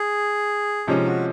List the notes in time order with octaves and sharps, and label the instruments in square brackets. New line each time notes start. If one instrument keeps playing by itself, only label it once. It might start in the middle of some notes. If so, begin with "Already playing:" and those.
Already playing: [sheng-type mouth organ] G#4
[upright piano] C3 F3 G#3 C#4 [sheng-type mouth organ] D#4
[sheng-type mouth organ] F#4